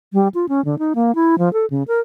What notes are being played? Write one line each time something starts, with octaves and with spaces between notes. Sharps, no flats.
G3
F4
C#4
D3
D#4
A#3
E4
F3
A4
C#3
A#4